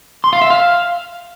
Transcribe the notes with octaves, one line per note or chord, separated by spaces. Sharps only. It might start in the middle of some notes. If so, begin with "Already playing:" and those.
C6
F5
E5
F5